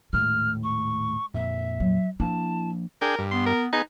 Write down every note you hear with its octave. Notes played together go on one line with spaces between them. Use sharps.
D#1 A2 G#3 A3 F6
C#6
F2 A#2 E5
F#3
F3 A#3 D4 E4 A5
D4 G#4 A#4 G5
G2
B3 C6
A#4
B3 D#4 G#4